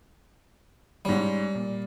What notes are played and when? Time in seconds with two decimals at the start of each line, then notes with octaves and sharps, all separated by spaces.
1.05 G#2 G3 C#4
1.55 A#2